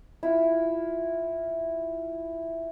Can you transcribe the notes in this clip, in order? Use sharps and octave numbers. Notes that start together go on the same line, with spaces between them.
E4 F4